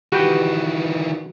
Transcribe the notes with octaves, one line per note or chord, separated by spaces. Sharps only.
D#3 E3 F#4 G4 B4 G5